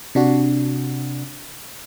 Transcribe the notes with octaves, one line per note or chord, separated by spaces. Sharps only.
C3 D4 F#4